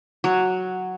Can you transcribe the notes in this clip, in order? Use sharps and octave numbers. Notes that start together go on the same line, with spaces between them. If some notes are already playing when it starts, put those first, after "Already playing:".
F#3